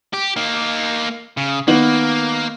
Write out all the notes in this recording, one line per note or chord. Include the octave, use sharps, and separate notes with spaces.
G4
A#3 D#4
C#3
D#3 A#3 B3 F#7